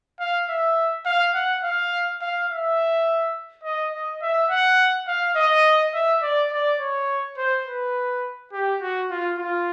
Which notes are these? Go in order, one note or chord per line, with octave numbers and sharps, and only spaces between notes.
F5
E5
F5
F#5
F5
F5
E5
D#5
D#5
E5
F#5
F5
D#5
E5
D5
D5
C#5
C5
B4
G4
F#4
F4
F4